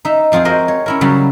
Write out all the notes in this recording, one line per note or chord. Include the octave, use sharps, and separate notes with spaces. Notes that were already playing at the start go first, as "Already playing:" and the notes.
D#4 E5
F2 F3 C4 F4 G#4
F#4 A#4 C5 D#5
C#5
C#4 E4 A#4
C#3 F#3 G3